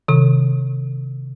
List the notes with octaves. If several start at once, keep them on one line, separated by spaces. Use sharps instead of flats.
C3 D#3